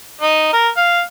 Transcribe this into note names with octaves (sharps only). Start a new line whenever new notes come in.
D#4
A#4
F5